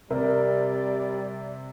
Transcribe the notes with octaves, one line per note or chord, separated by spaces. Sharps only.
C3 G3 A#4 D5